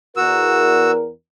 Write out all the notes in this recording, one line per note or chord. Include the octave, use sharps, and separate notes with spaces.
E2 F#4 A#4 E6